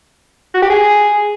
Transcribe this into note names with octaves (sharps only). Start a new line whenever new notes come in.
F#4
G4
G#4